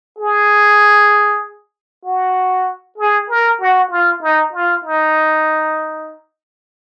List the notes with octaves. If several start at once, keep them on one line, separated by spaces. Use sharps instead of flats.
G#4
F#4
G#4
A#4
F#4
F4
D#4
F4
D#4